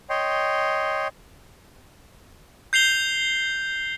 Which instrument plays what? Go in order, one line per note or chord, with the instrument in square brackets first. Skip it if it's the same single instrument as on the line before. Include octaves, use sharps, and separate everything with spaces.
[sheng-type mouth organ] C#5 D#5 G5 C6
[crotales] G6 C7 F7 G7